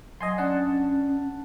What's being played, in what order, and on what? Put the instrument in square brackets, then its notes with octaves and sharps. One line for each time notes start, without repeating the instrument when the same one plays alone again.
[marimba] F#3 [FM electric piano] D#5 G#5 C6
[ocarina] C#4 [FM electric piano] D4 F#5 A5